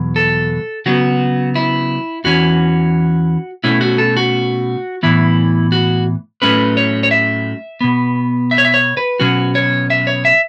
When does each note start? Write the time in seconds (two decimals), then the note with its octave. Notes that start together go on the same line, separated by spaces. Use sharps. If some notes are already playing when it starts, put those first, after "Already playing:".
Already playing: E2 B2 F#3
0.16 A4
0.86 C#3 F#3 B3 F#4
1.56 E4
2.24 E2 E3 C#4 F#4
3.64 B2 A3 C#4 E4
3.81 F#4
3.98 A4
4.17 F#4
5.03 A2 E3 B3 E4
5.72 F#4
6.42 A2 F#3 A3 C#4 B4
6.77 C#5
7.03 C#5
7.11 E5
7.81 B2 B3
8.51 E5
8.58 C#5
8.65 E5
8.74 C#5
8.97 B4
9.20 B2 F#3 C#4 F#4
9.55 C#5
9.90 E5
10.07 C#5
10.25 E5